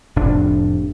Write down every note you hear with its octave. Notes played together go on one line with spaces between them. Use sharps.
F1 A2 C3 D4